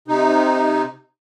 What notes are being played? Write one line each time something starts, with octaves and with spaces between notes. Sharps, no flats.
C3 D#4